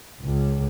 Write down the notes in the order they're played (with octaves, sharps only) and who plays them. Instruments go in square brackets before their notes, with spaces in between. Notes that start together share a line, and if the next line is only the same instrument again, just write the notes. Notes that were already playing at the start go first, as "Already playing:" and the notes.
[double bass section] C#2